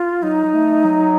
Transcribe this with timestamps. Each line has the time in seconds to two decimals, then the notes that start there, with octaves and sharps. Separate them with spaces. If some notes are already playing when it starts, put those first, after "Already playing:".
Already playing: F4
0.23 F#3 D#4
0.45 F#3
0.54 A3
0.84 F#3